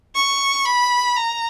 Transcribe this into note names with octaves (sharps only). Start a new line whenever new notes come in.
C#6
B5
A#5